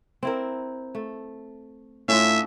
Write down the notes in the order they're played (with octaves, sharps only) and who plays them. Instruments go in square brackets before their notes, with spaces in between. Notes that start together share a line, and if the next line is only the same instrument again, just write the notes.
[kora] C4 E4 A#4
A3
[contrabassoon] A2 [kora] C#4 D4 F4 [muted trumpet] E5